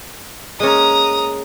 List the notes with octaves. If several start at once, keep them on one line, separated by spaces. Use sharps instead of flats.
G#3 A#3 C#4 A#5 D#6